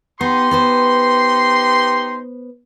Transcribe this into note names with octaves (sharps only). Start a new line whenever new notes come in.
B3 D#4 G4 C6
B3 B4 C5